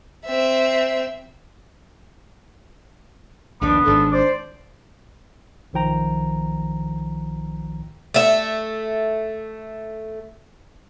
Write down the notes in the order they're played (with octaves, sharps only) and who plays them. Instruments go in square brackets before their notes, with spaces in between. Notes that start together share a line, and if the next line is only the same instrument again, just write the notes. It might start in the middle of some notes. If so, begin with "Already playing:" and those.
[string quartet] C4 E5
[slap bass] A#1 D#2 D#3 [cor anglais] B3 [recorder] D4
[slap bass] G#1 G#2 [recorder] D4 [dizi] A4
[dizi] C5 [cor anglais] D5
[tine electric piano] B1 D#3 F3 G5 A#5
[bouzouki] A3 E5